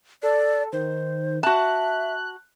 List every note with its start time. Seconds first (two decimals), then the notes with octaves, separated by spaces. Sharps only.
0.23 A4 D5
0.73 D#3 C5
1.43 F#4 E5 A5 F#6